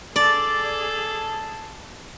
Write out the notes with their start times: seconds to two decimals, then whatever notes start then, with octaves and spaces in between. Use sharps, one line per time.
0.16 G#4 A4 D5